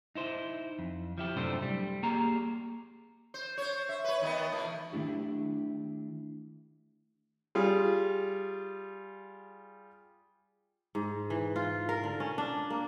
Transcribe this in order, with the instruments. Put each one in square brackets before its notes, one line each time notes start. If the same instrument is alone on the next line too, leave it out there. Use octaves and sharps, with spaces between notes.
[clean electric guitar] D#4 E4 C5
F2
F3 E4 G4
F#2 A2 C3 A3 D4 C5
G3
A#3 G4 G#4 A#5
[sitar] C5
C5 C#5
E5
B4 C#5
D#3 B3 D#5
B2 E3 A3
[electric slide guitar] D#3 A3 D4 E4 G4
[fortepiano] G3 F4 G#4
[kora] G#2
E3
F4
A#4
D3
C#4
D4
A#3